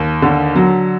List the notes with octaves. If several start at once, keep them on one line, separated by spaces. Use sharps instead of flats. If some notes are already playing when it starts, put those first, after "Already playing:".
Already playing: D#2
D3
F#3